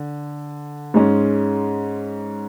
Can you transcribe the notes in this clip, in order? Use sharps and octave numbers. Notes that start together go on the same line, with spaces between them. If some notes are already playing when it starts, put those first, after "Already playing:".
Already playing: D3
G#2 G#3 C#4